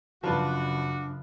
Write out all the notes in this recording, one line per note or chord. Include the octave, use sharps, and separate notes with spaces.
F#2 C#3 F3 D4 F#4 B4 A5